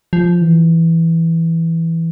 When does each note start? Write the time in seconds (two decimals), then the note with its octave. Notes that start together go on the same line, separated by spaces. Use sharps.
0.13 F3
0.42 E3